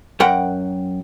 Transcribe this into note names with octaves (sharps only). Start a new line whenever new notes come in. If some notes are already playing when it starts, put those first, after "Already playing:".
F#2 A#4 F#5 G5